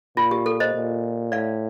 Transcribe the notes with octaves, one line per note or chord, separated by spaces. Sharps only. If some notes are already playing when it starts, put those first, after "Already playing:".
A#2 F4
G4
A4
C5 D#5
A#2
A2 D5 F5